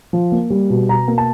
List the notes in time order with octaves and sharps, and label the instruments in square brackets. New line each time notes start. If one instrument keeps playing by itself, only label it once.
[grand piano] F3
A#3
G3
B2
B2 A#5
A#3
A5